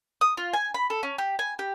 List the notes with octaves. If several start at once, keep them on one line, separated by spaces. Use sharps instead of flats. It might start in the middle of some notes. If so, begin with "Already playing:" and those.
D#6
F4
G#5
B5
A4
C#4
G4
G#5
G4